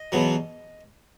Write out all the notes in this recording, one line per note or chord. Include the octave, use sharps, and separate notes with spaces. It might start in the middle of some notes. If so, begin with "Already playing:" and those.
Already playing: D#5
E2 B2 F#3